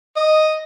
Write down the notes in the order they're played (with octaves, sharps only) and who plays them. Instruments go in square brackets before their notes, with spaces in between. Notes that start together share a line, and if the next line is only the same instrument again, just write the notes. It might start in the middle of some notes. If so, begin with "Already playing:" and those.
[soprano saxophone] D#5